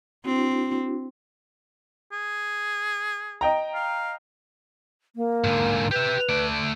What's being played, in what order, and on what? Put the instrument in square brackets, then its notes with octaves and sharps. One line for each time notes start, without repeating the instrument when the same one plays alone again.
[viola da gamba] C4 [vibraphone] D4 E4 F#4
[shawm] G#4
[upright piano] D#5 G5 A#5
[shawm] F5
[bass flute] A#3
[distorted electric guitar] G#2 D3
[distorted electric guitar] G4 E5 [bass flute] B4
[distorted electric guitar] A3 D5